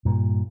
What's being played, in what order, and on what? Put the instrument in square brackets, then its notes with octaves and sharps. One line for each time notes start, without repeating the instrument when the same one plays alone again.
[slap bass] G2 A#2